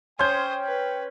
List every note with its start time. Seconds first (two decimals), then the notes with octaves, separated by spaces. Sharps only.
0.19 C#4 C5 G5 C6 D#6 G6
0.64 B4